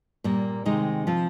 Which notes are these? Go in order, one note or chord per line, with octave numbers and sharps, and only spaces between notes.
A#2 G3 A#3
C3 D#3 G#3 D#4
F3 C4 F4